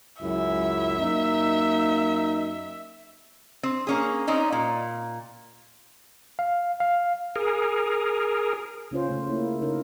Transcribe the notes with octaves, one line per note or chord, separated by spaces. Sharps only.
C#2 F#2 E4 E5
F#2 A#3 D#4
C4
A#3 C#4 G#4
C4 C#4 D#4 D5
A#2
F5
F5
G#4 A#4
C#3 C#4 F4 C5
C#3 A3 F4
A#3 E4
C#3 D#4 A#4